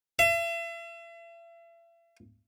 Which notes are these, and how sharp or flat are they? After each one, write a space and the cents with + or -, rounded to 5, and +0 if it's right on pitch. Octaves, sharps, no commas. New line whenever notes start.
E5 +40